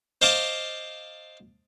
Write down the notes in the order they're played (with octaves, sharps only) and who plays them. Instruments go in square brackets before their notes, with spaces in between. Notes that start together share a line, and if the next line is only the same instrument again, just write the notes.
[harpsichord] C5 D#5 F5 A5 C6 D6